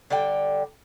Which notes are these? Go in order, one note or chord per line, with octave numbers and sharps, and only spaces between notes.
D3 G3 D5 G5